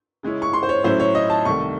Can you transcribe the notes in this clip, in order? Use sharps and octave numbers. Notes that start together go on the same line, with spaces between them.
C#3 G#3 C#4 E4
C#6
C6
C5
C#5
A2 F#3 C#4 E4 C5
C#5
D#5
A5
C2 C3 D#3 A3 C#6